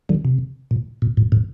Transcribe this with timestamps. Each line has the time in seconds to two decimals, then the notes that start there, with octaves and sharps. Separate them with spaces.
0.09 D#3 G3
0.25 C3
0.71 A#2
1.02 A#2
1.17 A2
1.32 A2